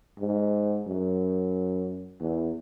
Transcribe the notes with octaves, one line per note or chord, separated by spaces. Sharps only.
G#2
F#2
E2